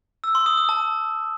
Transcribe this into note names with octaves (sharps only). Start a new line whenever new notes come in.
E6
C6
D#6
D#6
A5